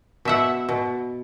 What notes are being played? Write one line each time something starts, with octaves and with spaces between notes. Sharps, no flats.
B2 E5 F#5
B2